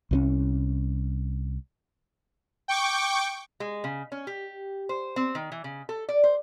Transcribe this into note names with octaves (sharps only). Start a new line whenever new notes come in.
C2 E3 C#4
G5 C#6 D6
G#3
C#3
C#4
G4
C5
C4
D#3
E3
C#3
A4
D5
C5